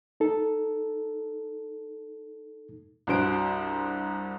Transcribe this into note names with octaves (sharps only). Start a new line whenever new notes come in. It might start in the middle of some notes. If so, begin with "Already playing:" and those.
D#4 A4
C2 G2 F#4 C5 D7